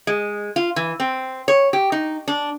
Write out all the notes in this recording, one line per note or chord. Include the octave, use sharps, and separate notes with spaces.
G#3
F4
E3
C4
C#5
G4
D#4
D4